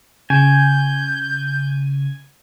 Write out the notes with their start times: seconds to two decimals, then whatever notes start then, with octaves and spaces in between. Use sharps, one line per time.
0.30 C#3 G#5 G6